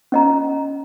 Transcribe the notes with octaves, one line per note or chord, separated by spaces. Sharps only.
C#4 D#5 A#5